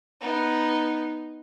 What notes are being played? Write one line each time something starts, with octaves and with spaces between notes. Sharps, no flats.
B3 D#4